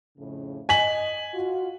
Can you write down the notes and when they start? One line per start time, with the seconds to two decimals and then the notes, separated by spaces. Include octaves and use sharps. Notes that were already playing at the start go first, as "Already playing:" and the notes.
0.17 F2 A2 C#3
0.69 D#5 G#5 B6 F#7
1.34 F4 F#4